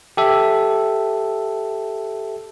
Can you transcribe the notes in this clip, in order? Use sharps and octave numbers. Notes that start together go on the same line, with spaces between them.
G4 A4 E5